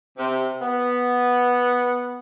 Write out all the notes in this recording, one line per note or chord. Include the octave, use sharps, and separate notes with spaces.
C3
B3